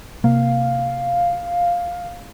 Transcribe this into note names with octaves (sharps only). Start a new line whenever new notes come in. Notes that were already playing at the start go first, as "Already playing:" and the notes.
C3 A#3 F5